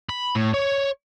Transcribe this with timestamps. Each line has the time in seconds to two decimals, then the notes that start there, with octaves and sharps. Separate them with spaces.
0.09 B5
0.35 A2
0.53 C#5